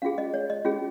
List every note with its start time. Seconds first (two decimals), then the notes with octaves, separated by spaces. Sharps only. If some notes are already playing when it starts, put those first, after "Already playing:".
0.02 C#4 F4 G#4 F5
0.18 D#5
0.34 C#5
0.50 D#5
0.65 C#4 F4 G#4